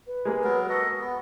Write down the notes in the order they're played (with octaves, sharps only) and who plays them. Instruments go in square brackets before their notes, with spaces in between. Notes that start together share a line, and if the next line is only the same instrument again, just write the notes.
[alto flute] B4
[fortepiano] G#3 A#3 G#4
[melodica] F#3 B3 A#4
F#4 A4 D#5
B3